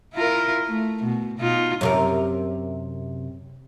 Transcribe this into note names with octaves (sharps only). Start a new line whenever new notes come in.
E4 F4 A#4
A3
B2
B2 D#4 F4
F#2 C3 A#4